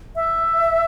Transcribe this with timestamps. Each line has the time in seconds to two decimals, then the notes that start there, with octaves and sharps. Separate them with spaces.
0.16 E5